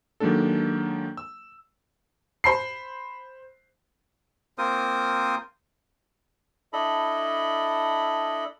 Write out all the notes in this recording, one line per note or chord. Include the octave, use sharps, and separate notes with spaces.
D#3 F#3 G#3 A#3 D4 A4
E6
C5 B5 C7
A#3 C4 F4 A#4 C5 D#6
D4 E4 A4 D#5 B5